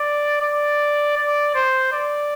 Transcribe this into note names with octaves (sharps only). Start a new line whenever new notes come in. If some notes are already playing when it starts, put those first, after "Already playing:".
Already playing: D5
D5
D5
C5
D5